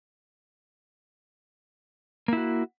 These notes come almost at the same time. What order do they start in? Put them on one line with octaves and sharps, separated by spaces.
A#3 E4 F#4